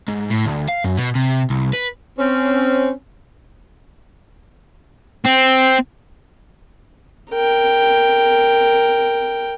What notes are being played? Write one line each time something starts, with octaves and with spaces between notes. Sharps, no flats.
G#2
A2
D2
F5
F#2
B2
C3
C2
B4
C4 C#4
C4
A#4 G5